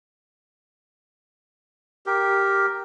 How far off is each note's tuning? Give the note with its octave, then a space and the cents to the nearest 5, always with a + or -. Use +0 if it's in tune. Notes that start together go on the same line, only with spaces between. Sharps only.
G4 +0 A#4 +0